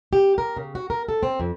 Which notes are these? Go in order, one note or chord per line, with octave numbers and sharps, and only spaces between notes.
G4
A#4
C#3
F#4
A#4
A4
C4
F2